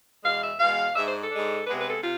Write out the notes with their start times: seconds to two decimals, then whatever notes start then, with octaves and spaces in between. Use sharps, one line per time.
0.24 E2 B2 G#3 F5
0.41 E5
0.59 E2 B2 G#3 F5
0.95 G#2 G#3 D4 E5
1.04 C5
1.22 A4
1.31 G#2 G#3 D4
1.66 C3 G#3 B3 D4 B4
1.78 B4
1.90 A4
2.02 C3 F4